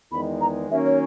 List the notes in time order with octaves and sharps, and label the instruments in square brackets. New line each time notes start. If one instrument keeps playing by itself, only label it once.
[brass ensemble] E2 D#3 G#3 [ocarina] B5
[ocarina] A#5
[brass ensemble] D#3 F#3 A#3 C#4 [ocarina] E5
[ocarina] C#5